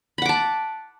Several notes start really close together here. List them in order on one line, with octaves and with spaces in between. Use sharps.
B5 F#5 D6 A5